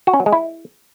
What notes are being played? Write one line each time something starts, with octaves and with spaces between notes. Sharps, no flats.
F#4
C#4
F#3
G#3
E4